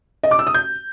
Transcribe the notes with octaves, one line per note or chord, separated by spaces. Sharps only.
D#5
D6
E6
D#6
G6